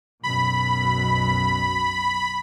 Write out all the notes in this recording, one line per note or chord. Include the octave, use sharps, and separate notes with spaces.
B1 F#2 B2 B5